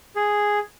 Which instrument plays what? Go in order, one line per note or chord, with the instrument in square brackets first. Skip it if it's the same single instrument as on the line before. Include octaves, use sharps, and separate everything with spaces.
[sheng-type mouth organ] G#4